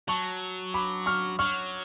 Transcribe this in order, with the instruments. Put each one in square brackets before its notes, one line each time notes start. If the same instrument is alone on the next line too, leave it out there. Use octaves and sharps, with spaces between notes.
[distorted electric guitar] F#3 [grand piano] A5 C#6
[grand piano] B5 D6
C#6 F6
[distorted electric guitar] F#3 [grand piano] C#6 F6